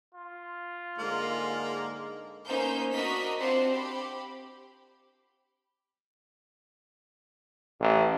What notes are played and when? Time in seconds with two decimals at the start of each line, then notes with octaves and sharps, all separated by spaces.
0.15 F4
0.98 G#2 D3 G#3 A#3
2.46 A#3 B3 C#4 D#4 C5 G6
2.92 D4 F#4 A#4 D#5 B6
3.39 C4 D4 F4 C5 F#5 C6
3.70 G4 B5
7.80 A1